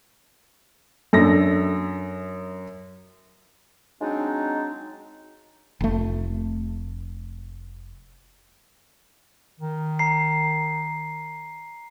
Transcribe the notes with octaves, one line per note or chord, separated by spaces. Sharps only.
F#2 D4 A4 A#6
F#3 G#3 C4 D4 D#4
F1 A3
D#3
A#5 C7